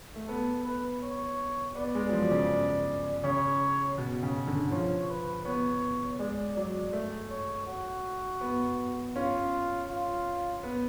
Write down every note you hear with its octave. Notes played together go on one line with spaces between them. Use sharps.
A3
B3 A4
B4
C#5
B3 D5
G#3
F#3
F3
C#3
C#3 C#5
B2
C#3
D3
F3 C#5
B4
B3 C#5
G#3 D5
F#3 D5
A3
C#5
F#4
B3
C#4 F4
F4
B3